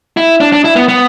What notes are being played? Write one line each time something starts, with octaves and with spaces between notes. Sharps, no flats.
E4
D4
D4
E4
B3
B3